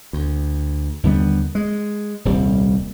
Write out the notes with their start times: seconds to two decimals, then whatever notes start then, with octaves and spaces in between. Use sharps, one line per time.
0.13 D2
1.03 D#2 D3 G3 B3
1.55 G#3
2.25 D#1 C2 G3